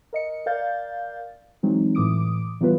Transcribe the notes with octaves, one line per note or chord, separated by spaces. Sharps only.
A#4 D#5 C#7
A#4 D5 F5 G6 A6
E3 F#3 G#3 C4 D#4
A2 E3 D6 D#6 D7
E3 F#3 G3 B3 F4 B4